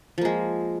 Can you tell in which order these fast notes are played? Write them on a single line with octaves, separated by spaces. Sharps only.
F3 A#3 G#3